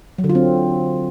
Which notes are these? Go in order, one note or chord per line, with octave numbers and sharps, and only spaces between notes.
F#3
D3
F4
C4